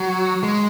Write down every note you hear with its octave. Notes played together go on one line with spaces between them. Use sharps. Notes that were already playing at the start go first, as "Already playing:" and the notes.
Already playing: F#3
G#3